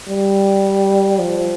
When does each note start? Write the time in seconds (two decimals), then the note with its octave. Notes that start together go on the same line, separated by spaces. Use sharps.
0.09 G3
1.20 F3